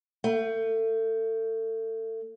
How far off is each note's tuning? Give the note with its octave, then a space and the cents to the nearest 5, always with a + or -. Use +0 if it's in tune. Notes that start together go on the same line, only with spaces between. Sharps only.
A3 +30